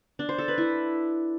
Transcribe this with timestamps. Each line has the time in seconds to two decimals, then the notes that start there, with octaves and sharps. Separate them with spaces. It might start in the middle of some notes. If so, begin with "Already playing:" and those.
0.19 D4
0.29 C5
0.38 A4
0.48 B4
0.58 E4